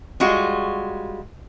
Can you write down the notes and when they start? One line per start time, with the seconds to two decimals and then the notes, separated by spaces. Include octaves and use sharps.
0.20 G3 G#3 F4 F#4